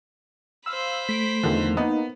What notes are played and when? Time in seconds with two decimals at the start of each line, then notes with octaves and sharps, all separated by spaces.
0.66 C5 F5 B5 E6
1.09 A3 B6 D7
1.43 E2 D3 D#3 F3
1.77 A#3 B3 D#4